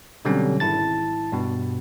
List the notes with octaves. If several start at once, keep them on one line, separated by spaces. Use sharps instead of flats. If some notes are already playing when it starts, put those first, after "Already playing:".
B2 D3 F#3 G3 C4 C#4
G#1 E4 A5 A6
G2 B2